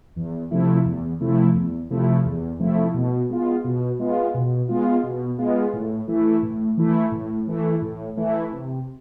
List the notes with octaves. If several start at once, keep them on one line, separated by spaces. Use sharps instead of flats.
E2
C3 F3 A3 E4
E2
C3 F3 A3 E4
E2
C3 F3 A3 E4
E2
C3 F3 A3 E4
B2
G#3 B3 F4
B2
G#3 B3 F4
B2
G#3 B3 F4
B2
G#3 B3 F4
A2
E3 A3 E4
A2
E3 A3 E4
A2
E3 A3 E4
A2
E3 A3 E4
C3